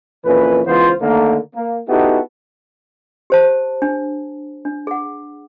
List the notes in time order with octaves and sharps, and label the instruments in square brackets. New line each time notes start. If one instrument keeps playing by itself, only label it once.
[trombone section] F2 A#2 E3 C#4 B4
C#2 E3 B3 F4 C5
D3 D#3 A3 A#3
A#3
B3 D#4 E4 F#4 G4 A4
[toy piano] G4 C5 A5
D4
D4
G#4 F#5